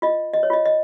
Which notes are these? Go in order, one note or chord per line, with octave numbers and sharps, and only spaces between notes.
F4 D#5
D#5
C#5
F4 D#5
D#5